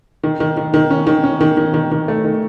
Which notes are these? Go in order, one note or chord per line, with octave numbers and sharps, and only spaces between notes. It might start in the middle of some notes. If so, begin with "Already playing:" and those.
D#3
D#3
D#3
D#3
C#4
D#3
C#4
D#3
D#3
D#3
D#3
A3
D#3